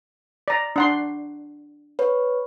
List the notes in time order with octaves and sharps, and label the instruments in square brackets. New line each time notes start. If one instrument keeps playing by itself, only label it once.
[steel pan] D5 A#5
D4 F#5 C6
[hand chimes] B4 C#5